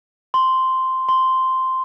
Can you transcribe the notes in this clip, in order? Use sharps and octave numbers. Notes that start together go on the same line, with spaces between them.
C6
C6